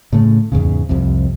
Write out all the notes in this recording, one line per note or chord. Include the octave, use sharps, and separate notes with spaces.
A2 C#3 A3
E2 G#2 C#3
C2 F2 C3